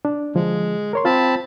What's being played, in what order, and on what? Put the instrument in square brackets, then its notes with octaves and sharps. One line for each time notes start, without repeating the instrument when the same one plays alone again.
[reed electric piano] D4
[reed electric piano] D3 F3 [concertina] G#3
[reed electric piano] A#4 C#5 C6
[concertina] C4 A5 B5 [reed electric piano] F4